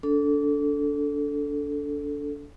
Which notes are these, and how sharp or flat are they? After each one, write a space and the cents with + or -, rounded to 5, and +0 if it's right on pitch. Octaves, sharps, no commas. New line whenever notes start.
D4 -25 A4 +0